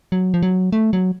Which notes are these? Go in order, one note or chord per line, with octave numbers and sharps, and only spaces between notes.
F#3
F3
F#3
A3
F#3